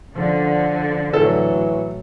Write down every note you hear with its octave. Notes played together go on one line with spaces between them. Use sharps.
D3 F3
A2 E3 F#3 A4